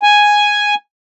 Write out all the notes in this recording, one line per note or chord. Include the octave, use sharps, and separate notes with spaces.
G#5